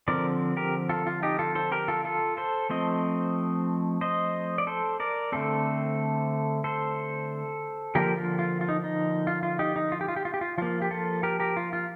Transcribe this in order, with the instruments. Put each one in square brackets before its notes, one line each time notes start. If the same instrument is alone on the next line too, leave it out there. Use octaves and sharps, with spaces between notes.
[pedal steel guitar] D3 F3 C4 A#4 D5
G4 A#4
F4 A4
F4
D#4 G4
F4 A4
A4 C5
G4 A#4
F4 A4
F4 A4
A4 C5
F3 A3 C4 C5 D#5
C5 D#5
D5
A4 C5
A#4 D5
D3 A3 C4 A4 C5
A4 C5
D3 F3 A#3 G4 A#4
F4
F4
F4
D#4
D#4
F4
F4
D#4 G4
D#4
F4
G4
F4
G4
F4
G4
F4
F3 A#3 F4
G4
F4 A4
G4 A#4
G4 A#4
F4
F4